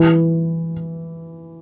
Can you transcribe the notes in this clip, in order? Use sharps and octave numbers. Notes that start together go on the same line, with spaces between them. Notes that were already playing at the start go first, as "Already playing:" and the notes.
Already playing: E3